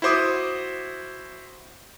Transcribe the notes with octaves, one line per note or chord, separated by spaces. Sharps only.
E4 F#4 C5 D6 D#6